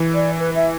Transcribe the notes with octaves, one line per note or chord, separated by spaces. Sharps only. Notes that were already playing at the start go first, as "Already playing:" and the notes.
Already playing: E3
D5
B4
E5